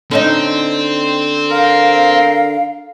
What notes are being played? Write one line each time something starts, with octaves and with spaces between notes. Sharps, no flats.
D3 C4 C#4 D#4
A#4 F5